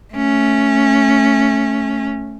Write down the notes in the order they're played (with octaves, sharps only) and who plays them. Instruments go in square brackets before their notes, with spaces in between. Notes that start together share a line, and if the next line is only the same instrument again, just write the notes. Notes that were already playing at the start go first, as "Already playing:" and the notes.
[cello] A3 C#4